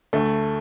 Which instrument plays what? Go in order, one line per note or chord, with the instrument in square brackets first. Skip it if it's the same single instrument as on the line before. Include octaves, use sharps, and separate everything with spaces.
[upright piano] D2 A3